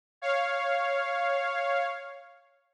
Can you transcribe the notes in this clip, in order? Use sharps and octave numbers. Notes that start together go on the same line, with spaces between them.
C#5 F5